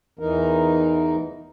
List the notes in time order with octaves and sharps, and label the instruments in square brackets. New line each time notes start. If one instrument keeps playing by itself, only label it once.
[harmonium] E2 E3 D#4 A#4